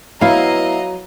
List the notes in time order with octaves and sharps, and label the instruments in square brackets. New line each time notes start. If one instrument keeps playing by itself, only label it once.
[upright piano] F#3 [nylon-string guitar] B3 E4 [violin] D#5 A#5 [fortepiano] F5